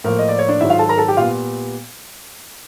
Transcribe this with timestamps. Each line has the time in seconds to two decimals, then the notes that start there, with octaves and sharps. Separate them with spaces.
0.04 A2 F3 A#3 A#4
0.19 D#5
0.29 D5
0.39 C#5
0.48 D4 D5
0.60 G#2 D#3 F#3 E4 E5
0.70 F4 F5
0.79 A4 A5
0.89 A#4 A#5
0.98 A4 A5
1.08 G4 G5
1.17 A#2 G3 B3 F4 F5